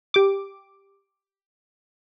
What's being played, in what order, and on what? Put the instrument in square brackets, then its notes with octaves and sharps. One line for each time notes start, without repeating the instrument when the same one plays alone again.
[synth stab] G4 D6